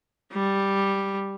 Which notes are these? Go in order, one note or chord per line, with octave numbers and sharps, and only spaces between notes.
G3